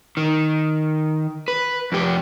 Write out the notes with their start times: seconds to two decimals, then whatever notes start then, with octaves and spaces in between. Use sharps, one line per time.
0.17 D#3
1.48 B4
1.92 F2 G4